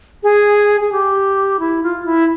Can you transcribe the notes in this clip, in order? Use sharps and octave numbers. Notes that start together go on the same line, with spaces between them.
G#4
G#4
G4
E4
F4
E4